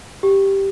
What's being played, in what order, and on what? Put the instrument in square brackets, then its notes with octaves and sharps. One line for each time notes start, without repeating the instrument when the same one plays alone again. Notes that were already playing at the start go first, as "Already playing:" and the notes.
[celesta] G4